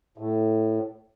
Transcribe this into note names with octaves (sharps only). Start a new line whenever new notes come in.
A2